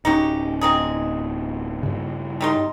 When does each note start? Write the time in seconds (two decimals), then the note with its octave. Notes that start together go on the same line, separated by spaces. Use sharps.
0.05 D1 C#4 D#4 F#4 G4
0.61 C4 D#4 G#4
1.83 G2 C#3
2.41 G3 D#4 C6